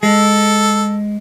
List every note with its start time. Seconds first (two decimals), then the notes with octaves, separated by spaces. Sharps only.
0.03 G#3 A4